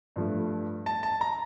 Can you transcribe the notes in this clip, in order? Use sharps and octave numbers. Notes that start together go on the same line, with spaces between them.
G2 F3 A3
A5
A5
A#5